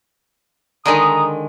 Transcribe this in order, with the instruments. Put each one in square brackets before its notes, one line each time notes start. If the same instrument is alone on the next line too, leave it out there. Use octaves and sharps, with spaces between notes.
[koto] D3 D#3 G#3 [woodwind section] A#5 D#6